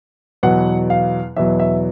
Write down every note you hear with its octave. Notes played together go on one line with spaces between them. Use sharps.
E2 B2 F#3 F#5
F5
E2 B2 F#3 E5
E5